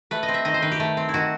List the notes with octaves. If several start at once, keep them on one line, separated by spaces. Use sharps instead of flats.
A3 B4
D#5
C4
E5
D#3 D#5
C5
D#3 B4
G4
A3
C4
E4
D#3 F#4